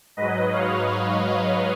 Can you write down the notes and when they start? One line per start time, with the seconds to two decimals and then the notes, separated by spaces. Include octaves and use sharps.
0.17 G#2 F#3 B4 D#5
0.53 C#5 F5